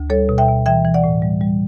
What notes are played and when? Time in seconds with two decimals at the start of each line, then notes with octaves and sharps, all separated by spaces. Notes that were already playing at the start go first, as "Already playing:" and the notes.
Already playing: D2
0.10 G3 A4 C#5
0.29 B2
0.38 E5 G5
0.48 B2
0.66 E3 E5 G5
0.85 E3
0.94 D5 F#5
1.04 A2
1.22 G3
1.41 G3